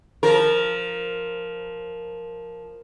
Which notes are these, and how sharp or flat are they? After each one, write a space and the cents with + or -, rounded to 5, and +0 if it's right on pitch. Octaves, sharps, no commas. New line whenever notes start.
F3 +0 A#4 +0